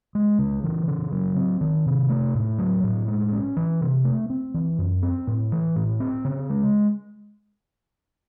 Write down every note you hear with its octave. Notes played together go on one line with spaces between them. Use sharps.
G#3
C#3
E3
C#3
F#3
C4
D#3
C3
A3
A2
F#3
A2
G#3
C#4
E3
C3
A3
C4
E3
F#2
C4
A2
E3
A2
C4
C#3
G#3